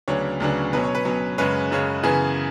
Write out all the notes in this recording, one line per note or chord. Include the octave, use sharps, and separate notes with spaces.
D2 C#3 F#3 B3 D4 C#5
D2 C#3 F#3 B3 D4
B2 F#3 C#4 B4
C#5
B4
B2 F#3 C#4
F#2 C#3 G#3 C#4 B4
F#2 C#3 G#3 C#4
F#2 C#3 E3 B3 G#4